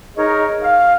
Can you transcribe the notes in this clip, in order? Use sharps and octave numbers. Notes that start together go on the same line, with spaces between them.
D#4 G#4 A#4 C#5 D#5
F5